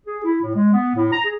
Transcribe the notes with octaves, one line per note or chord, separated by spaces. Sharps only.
G#4
E4
A2
G#3
B3
A2
A#5
G#4